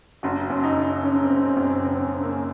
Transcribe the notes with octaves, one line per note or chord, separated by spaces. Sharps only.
F#1 F#4
F#2
D#4
F#1
C#3 C#4
C4
F#1
C4
F#2
C4
F#1 C4
C#3
A#3